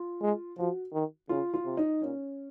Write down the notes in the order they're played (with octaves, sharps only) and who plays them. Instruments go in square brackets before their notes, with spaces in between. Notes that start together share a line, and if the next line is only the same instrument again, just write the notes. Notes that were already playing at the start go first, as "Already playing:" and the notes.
Already playing: [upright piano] F4
[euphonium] G#3
[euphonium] F3 [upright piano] F#4
[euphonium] D#3
[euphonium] C#3 [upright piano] F4
[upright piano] F4
[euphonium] C3
[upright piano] D#4
[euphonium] A#2 [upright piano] C#4